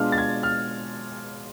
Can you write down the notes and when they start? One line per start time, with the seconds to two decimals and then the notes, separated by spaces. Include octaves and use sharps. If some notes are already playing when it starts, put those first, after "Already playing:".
Already playing: B2 G#3 D4 F4 F6
0.12 A6
0.18 G#6
0.43 F6